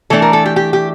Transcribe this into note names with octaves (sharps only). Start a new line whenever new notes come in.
E3 A3 D4 A4
A#4
A4
G4
G4
G4